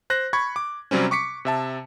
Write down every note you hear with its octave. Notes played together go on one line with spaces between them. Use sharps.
C5 F#6 A#6
B5 C#6 G#6
D6
C3 F#3 G3 C4 C#4
C#6 D6 B6 C#7
C3 E5 A5